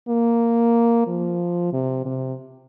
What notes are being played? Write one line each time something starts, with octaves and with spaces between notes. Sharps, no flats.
A#3
F3
C3
C3